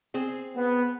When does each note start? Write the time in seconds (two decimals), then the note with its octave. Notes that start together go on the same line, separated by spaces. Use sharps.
0.14 C4 G#4
0.56 B3